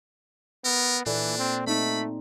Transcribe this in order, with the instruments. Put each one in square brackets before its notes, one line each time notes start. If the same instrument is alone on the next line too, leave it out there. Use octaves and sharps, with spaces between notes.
[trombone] B3 [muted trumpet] A#4
[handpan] A#2 A4 D5 [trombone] E3 [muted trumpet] D4
[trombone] C4
[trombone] A3 [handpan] C4 D#4 [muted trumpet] B5